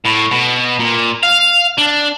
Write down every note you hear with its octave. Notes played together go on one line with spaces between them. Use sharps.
A2
B2
A#2
F5
D4